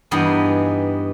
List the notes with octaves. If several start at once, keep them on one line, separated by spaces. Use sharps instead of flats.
G2 E3 B3 D#4 G#4 D#5